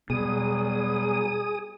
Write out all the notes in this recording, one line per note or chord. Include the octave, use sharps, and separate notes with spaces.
E2 B2 F#3 G3 G#4 D#6